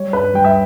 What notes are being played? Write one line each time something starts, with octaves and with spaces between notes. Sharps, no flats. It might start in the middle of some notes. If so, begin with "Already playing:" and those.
Already playing: G3 C#5
G2 B4
G3 G5
E5